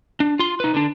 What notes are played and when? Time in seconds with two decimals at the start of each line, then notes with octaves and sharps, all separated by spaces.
0.20 D4
0.39 F4 C6
0.60 D#4 B4
0.74 D3 D4